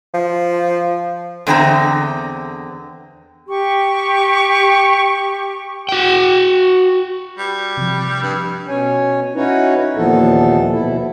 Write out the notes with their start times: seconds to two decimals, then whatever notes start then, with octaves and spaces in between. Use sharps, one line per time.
0.14 F3
1.47 E2 D3 C4 F4 A#5
3.48 G4 C#6
5.89 F#4 G5
7.38 G3
7.77 C3 F3
8.22 G2 E6 F#6 G#6
8.68 B2 C#4 C#5 G#5
9.35 C#4 D#4 E4 F#4 B4 C#5
9.96 D#2 A#2 E3 F3 B3 A4
10.72 B2 E4